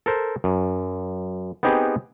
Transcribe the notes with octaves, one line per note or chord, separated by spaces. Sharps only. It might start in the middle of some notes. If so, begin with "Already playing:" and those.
A4 A#4 C5
F#2
B3 C4 D#4 G4 G#4 B4